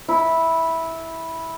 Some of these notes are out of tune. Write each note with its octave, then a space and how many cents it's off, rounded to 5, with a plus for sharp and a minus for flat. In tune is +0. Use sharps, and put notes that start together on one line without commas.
E4 -10